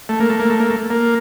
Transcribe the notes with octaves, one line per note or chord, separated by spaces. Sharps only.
A3
A#3
A3
A#3
A3
A#3
A3
A#3